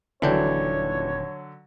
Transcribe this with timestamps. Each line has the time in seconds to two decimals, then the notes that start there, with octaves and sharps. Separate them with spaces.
0.22 D#1 D3 E3 F#3 D4 C#5 G5